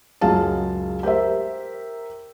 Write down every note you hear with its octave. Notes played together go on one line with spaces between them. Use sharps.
C#2 F#2 F#3 G#3 F5 A5
G4 A#4 C5 E5